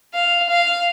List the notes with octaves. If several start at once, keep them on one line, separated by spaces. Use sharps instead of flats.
F5
F5